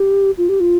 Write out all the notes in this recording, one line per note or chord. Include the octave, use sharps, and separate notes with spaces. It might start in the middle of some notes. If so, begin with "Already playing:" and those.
Already playing: G4
F4
G4
F4